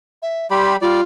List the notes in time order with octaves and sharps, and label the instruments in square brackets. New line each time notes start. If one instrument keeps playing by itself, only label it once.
[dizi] E5
[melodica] G3 G4 B5 [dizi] C6
[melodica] G3 D5 [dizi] F4